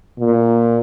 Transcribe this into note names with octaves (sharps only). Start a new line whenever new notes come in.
A#2